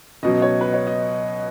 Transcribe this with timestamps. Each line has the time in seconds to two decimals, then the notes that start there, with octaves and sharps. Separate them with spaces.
0.23 C#2 B2 F#3 D#5
0.42 C#5
0.61 B4
0.74 C#5
0.87 D#5